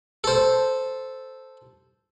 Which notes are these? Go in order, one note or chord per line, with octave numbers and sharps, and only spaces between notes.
A4 C5